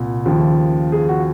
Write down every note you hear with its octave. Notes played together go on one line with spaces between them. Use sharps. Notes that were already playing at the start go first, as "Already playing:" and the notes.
Already playing: C2 A#2
D#2 C#3 F3
G#4
F#4